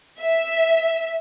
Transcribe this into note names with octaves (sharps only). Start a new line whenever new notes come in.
E5